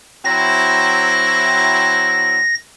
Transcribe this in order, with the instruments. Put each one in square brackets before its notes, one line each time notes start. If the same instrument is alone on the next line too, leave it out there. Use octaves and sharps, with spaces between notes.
[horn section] F#3 C4 E4 [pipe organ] A#6